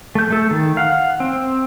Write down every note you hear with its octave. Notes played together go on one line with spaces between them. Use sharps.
A3 G6
A3 A4
D#3
F5 F#5
C4